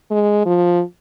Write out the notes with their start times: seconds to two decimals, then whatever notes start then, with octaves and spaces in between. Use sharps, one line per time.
0.11 G#3
0.45 F3